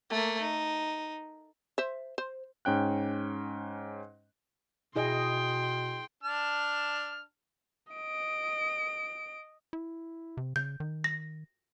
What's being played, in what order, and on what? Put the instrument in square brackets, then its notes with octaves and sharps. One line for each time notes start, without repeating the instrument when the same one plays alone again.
[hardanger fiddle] A3 A#3
D#4
[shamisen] C5 E5
C5
[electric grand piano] G#2 C#4 G5 F#6
[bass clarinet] B2 [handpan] E4 G#4 D#5 [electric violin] G5 C6
[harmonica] D4 A5 F6
[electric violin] D#5 D7
[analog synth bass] E4
C3
[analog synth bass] C#3 [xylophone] G6
[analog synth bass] D#3
[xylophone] A#6